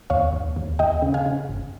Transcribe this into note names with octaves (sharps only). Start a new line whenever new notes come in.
D#2 C#5 F5
D#2
D#2
D#2 D#5 G5
C#3
F5 G#5
C#3
G1